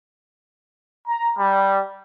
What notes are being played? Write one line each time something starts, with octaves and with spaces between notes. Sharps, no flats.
A#5
G3